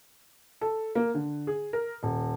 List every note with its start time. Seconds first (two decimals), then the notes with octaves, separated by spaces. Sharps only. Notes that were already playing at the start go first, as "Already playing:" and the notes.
0.61 A4
0.95 A#3
1.14 D3
1.47 G#4
1.73 A#4
2.03 D#1